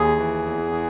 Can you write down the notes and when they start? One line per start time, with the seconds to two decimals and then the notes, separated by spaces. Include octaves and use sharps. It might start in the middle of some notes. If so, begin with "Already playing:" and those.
Already playing: D#2 G#4
0.17 E3
0.45 E2
0.72 E3